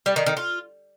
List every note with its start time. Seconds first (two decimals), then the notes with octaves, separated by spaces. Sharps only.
0.06 G3
0.16 D#3
0.26 D#3
0.37 F4